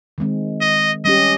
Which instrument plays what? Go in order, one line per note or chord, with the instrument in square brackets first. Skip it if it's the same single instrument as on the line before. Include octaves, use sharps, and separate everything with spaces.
[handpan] D#3 G#3 C4
[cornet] D#5
[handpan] G3 C#4 G4 [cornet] D#5